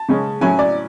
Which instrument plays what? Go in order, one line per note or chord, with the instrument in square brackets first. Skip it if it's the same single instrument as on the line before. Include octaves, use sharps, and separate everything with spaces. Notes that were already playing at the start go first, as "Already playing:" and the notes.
Already playing: [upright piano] A5
[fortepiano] C#3 G#3 C#4
[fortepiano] A2 F#3 C#4 E4 [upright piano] G#5
[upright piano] D5